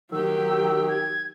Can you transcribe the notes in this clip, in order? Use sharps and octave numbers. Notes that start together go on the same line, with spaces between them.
D#3 F#3 G4 E6
G#6